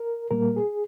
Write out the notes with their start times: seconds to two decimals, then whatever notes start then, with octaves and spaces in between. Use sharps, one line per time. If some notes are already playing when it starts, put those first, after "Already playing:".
Already playing: A#4
0.31 A#2 G3 A#3 A#4
0.56 G#4